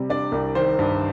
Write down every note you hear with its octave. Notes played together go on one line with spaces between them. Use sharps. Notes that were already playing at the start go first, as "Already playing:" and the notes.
Already playing: C3 G3
D4 D5
C2
D#3 C5
G2